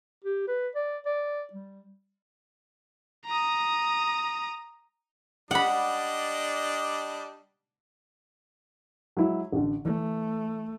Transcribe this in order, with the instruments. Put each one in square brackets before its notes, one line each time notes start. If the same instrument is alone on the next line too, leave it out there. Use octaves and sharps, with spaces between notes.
[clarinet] G4
B4
D5
D5
G3
[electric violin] A#5 D#6
[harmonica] G3 D4 D#5 [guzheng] F#5 B5
[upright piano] F#3 G#3 E4
A1 D3
[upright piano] E3 [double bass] A3